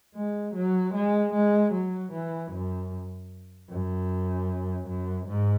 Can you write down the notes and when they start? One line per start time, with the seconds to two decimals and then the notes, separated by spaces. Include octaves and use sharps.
0.15 G#3
0.55 F#3
0.94 G#3
1.34 G#3
1.73 F#3
2.12 E3
2.52 F#2
3.70 F#2
4.88 F#2
5.27 G#2